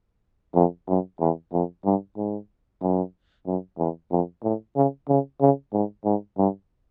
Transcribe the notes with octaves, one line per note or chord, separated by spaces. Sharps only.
F2
F#2
E2
F2
G2
G#2
F#2
F#2
E2
F2
A2
C#3
C#3
C#3
G#2
G#2
G2